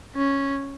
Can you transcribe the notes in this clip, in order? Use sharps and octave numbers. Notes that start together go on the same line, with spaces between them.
C#4